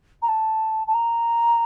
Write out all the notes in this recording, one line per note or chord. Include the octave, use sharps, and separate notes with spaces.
A#5
A5
A5
A#5